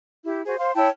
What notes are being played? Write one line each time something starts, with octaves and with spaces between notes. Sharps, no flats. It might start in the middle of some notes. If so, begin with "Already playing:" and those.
E4 G4
F#4 G#4 C5
C5 F5 C6
E4 C#5 G5 A5